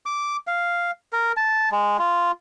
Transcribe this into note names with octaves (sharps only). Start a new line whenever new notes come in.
D6
F5
A#4
A5
G#3
F4